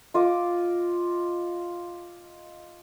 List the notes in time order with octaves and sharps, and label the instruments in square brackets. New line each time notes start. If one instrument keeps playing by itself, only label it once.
[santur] F4 D#5 D6